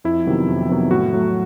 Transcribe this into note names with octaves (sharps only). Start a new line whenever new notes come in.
F2 E4
C3 D#3 F#3 B3
F2
C3 D#3 F#3 B3
A2 F#4
F#3 A3